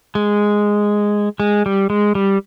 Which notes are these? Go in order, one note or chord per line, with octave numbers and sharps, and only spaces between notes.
G#3
G#3
G3
G#3
G3